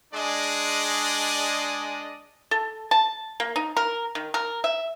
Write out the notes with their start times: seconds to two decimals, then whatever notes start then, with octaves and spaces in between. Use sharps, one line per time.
0.14 G#3 D4 G#4 D5 D#5
2.51 A4
2.91 A5
3.40 A#3
3.56 D#4
3.77 A#4
4.15 D#3
4.34 A#4
4.64 E5